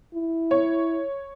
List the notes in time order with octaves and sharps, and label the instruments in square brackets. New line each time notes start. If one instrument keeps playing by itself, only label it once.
[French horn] E4
[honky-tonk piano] C#5